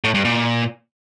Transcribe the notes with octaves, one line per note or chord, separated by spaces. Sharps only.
A2
G2
A#2